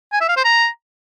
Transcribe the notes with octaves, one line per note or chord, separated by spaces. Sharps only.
G#5
E5
F5
C5
A#5